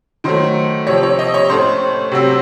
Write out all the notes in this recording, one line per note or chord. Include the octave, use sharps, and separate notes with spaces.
D#3 F#3 A3 C5
C3 F3 C4 C#5
C#5
D#5
C#5
A2 A3 C#4 C5
C3 F#3 C4